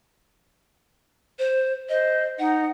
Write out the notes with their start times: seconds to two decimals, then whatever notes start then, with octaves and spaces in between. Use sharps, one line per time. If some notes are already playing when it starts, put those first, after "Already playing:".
1.39 C5
1.89 C5 D#5
2.39 D#4 F#5